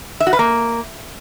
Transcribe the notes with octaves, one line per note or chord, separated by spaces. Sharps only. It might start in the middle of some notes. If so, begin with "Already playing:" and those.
E5
F#4
B4
A#3